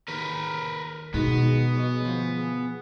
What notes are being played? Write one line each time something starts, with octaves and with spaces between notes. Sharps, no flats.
D#2 A#4 B4
B2 D#3 G#3 B3 D#4 G#4
F#3 B4 D#5
D2 F3